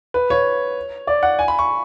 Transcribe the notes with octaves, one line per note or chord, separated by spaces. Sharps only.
B4
C#5
D5
F#5
G#5
B5
C#6